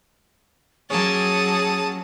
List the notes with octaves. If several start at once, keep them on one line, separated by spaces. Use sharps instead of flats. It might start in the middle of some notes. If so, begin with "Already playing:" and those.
F#3 A#3 C#4 G#4 A5 D#6